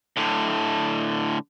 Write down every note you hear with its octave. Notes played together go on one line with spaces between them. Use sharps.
A2 D3